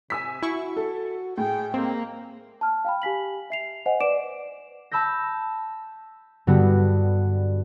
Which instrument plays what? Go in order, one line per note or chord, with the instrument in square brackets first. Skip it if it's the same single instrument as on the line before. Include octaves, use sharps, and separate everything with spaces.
[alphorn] C3 [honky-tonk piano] G#5 E6 B6
[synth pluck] E4 C#6 [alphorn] F#4
[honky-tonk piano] A4
[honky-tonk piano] A2 [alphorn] G#4 [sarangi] G5
[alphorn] G#3 [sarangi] A#3 [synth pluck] C4
[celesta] A5 F6
F5 G5 B5
G4 G#5 B6 F#7
E5 C7 F7
C5 D#5 F#5 G#5
B4 D5 D6 D7 E7
[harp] A5 B5 E6 G6 A#6
G2 D3 G3 B3 F#4